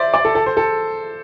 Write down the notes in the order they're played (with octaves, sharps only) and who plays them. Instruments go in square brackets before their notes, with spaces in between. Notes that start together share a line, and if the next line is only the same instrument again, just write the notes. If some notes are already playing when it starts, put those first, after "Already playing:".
Already playing: [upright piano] C5 D5 E5
D5
A4
A4
C5
A4